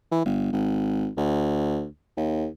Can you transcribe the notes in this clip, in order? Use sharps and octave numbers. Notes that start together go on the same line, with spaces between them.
E3
G1
G#1
D2
D#2